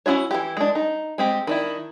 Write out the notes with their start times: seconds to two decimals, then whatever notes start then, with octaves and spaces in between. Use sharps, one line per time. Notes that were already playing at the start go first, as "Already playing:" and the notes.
0.06 C#4 E4 F#4 C#5
0.31 E3 E4 G4
0.57 G#3 D4
0.75 D#4
1.18 G#3 C4 G4
1.47 D#3 D4 E4